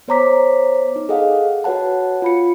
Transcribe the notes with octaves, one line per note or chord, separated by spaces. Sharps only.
B3 C5 C#5 A#5 D6 B6
D#4
G#4 A4 D#5 F5 F#5
F#4 B4 C#5 F#5 A5
F4 B5 C#7